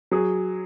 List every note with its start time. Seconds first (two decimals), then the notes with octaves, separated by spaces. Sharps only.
0.11 F#3 G#4